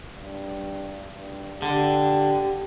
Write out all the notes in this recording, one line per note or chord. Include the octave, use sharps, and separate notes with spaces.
G2
G2
D3 G4